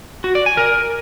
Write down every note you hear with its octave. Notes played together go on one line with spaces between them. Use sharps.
F#4
D5
G#5
A#4